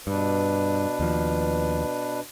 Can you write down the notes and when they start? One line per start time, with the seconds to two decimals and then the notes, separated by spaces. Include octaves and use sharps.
0.07 G2 B2 D4 B4
1.00 D#2 F3